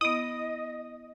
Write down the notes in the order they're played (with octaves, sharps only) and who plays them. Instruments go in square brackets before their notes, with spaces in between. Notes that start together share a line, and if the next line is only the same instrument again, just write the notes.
[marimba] B3 E4 [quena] D#5 [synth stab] D#6